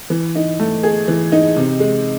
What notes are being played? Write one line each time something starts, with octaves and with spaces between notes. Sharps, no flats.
E3
D#4
A3
G#4
E3
D#4
C3
G#3